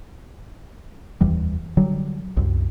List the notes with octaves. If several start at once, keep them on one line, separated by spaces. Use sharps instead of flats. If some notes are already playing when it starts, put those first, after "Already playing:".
F1 D#2 E3 G3
D3 F#3 G3
C2 F#2